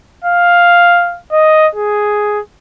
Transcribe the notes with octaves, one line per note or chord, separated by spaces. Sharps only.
F5
D#5
G#4